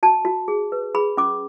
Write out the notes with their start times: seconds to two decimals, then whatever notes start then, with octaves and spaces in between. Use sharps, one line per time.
0.03 F#4 A5
0.25 F#4
0.48 G#4
0.72 B4
0.95 G#4 B5
1.17 C#4 D6